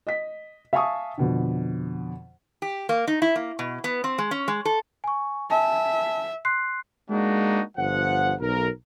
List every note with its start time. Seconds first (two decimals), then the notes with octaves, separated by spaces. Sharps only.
0.07 D#5 B6
0.73 E5 F5 G#5 A5 C#6 D#6
1.18 F2 B2 D3
2.62 G4
2.89 A#3
3.08 D#4
3.22 E4
3.36 A#3
3.59 B2
3.84 B3
4.04 C4
4.18 G#3
4.31 C#4
4.48 G#3
4.65 A4
5.04 G#5 C#6
5.50 E5 G#5 A5
6.45 C6 F#6 C7
7.10 G#3 A#3 D4 D#4 F#4
7.78 G1 F3 F#5
8.41 B1 A#4